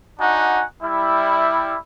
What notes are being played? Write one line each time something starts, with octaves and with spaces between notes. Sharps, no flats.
D4 D#4 F#4 F#5 G#5
G3 E4